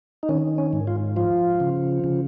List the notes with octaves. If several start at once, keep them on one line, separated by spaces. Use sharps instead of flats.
D#4
D#3 C#4
C#4
G#2
F4
F3 F4
C#3
C#3